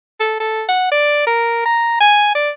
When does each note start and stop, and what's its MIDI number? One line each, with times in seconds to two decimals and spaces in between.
0.20 0.36 69
0.40 0.64 69
0.69 0.89 78
0.92 1.22 74
1.27 1.65 70
1.66 1.97 82
2.00 2.30 80
2.35 2.50 74